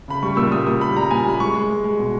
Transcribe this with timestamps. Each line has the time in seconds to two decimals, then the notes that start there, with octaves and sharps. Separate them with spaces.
0.08 C#3 B5
0.23 G3 C#6
0.37 A#2 E6
0.52 G3 D#6
0.67 A#2 D#6
0.81 G3 B5
0.96 G3 A#5
1.11 A#2 G#5
1.25 G3 B5
1.40 G#3 C#6
1.55 G#3
1.70 G#3
1.84 G#3
1.99 B2